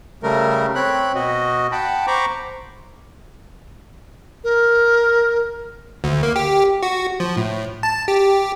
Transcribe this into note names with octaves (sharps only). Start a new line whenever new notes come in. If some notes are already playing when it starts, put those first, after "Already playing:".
C#3 G3 A3 A#4
C4 C#5 B5 F#6
B2 F#4 D#5
F#5 G5 A5 B5
C5 A#5 B5 C#6 D6
A#4
D2
A#3
G4
F#4
F3
A2
A5
G4